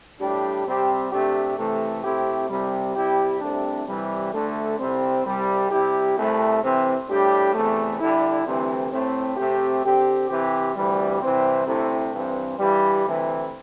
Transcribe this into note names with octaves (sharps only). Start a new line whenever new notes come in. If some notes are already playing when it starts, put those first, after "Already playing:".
A2 G3 D4 G4
C3 G3 C4 G4
C3 A3 D4 G4
C3 E3 A3
C3 A3 C4 E4 G4
C2 C3 G3
C3 G3 E4 G4
C2 C3 A3 D4
C3 E3 G3
D2 D3 A3
C2 C3 G3 C4
C2 C3 G3
C3 G3 E4 G4
C2 C3 A3 E4
C3 E3 C4
A2 G3 D4 G4
E2 C3 A3
D3 G3 E4
D2 C3 E3 G3 C4
A2 A3 C4
C3 A3 C4 G4
D3 C4 G4
C3 E3 C4 G4
D2 C3 E3 G3
C2 C3 E3 C4
D2 C3 A3 C4 E4
G2 E3 C4
G2 E3 G3
D2 C3 E3